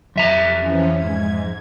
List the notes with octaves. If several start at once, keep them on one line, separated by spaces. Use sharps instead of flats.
F2 E5 A#5
E3 F3 C#4
G#2 G#6